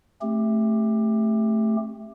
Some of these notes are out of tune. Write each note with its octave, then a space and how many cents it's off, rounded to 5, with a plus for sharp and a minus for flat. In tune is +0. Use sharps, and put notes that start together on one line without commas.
A3 +0 C4 +35 G4 +15